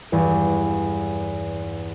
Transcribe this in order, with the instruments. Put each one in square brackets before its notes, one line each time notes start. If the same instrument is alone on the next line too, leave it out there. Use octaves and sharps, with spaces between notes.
[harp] E2 G2